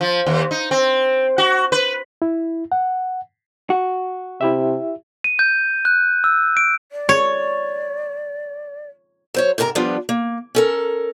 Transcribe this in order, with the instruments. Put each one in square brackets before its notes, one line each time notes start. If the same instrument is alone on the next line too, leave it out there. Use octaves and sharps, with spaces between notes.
[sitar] F3
D#2
D#4
C4
F#4
B4
[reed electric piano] E4
F#5
[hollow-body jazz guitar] F#4
[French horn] C3 [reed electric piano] E4 G4 E5
[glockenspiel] D#7
G6
F#6
E6
D7
[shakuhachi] D5
[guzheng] C#5
[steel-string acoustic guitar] F#3 C5 C#5
G#2 C3 A#4 A5 A#5
F3 G3 B3 D4 F4
A#3
C#4 A4 A#4